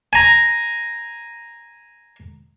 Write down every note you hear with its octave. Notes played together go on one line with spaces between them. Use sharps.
G#5 A#5